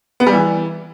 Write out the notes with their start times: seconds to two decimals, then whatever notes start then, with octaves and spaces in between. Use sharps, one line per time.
0.20 B3
0.26 G3
0.33 E3